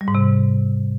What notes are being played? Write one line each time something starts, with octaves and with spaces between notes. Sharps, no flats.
G3
G#2
C3